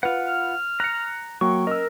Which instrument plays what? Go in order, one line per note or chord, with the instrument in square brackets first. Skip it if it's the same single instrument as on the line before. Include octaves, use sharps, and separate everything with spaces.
[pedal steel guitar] F4 F#5 [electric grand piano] B4
[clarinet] F6
[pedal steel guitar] A#5 [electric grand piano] F#6 C#7
[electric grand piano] F#3 A#3 [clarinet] G5 [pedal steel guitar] C#6
[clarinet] C#4 [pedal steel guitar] A#4 [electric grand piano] D#5 E6